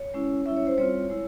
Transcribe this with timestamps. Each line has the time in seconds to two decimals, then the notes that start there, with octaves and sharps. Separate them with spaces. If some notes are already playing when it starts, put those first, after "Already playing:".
Already playing: C#5
0.14 G#3 C#4 E4
0.45 G3 C#4 E4 E5
0.56 C#5
0.67 C5
0.78 G3 C4 F4 C#5
1.10 G#3 E4